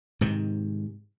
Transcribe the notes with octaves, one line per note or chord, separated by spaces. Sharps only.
G#2 C3 D#3